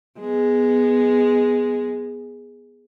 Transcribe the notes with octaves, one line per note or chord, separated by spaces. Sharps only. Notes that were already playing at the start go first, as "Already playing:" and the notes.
G#3 B3